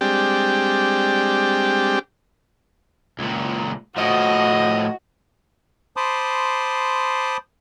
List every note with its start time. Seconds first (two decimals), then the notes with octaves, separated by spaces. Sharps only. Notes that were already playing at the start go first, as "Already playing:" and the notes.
0.01 G3 G#3 C4 D4 G4 G5
3.19 C#2 A#2
3.97 A2 F3 F#4 D#5
5.97 C5 A5 B5 C6 D6 D#6